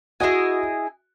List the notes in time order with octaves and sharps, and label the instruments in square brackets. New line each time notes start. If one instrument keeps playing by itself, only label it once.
[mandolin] E4 G#4 D#5 G#5 [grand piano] F#4